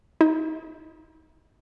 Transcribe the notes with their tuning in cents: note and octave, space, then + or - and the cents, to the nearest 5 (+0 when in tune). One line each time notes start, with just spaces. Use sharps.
D#4 +25